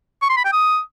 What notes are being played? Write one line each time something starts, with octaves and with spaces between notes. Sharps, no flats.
C#6
C6
B5
G5
D#6